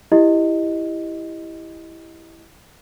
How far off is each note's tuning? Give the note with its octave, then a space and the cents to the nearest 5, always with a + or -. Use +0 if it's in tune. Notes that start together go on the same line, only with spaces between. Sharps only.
E4 +0 G4 +0 D#5 +0